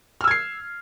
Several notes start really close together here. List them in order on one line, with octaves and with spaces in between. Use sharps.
F6 E6 G#6 C7